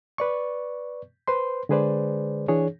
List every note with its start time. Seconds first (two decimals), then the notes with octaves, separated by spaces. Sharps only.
0.18 B4 D5 C#6
1.28 B4 C5 C6
1.69 D3 G#3 G#4 B4 C5 D5
2.48 E3 D4 G#4 C#5